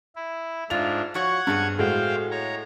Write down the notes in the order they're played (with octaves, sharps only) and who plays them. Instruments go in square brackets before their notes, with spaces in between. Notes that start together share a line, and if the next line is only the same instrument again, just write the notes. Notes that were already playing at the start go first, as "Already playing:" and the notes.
[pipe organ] E4
[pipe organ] G#2 D4 [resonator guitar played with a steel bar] A3 F4 [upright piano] F7
[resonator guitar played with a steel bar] F3 F#4 C#5 [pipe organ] F#5 C#6 G#6
[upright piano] G2 [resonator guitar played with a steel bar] B3 C4 G#4
[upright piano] A2 G#3 F#4 [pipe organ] C5 F5 G5
[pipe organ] C#5 A#5